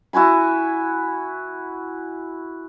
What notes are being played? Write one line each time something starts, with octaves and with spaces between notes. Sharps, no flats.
E4 F#4 G#5 B5